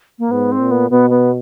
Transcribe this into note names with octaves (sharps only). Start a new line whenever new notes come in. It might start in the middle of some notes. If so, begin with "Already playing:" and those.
A#3
G#2 B3
C4
A#2
B3
B2 B3
B3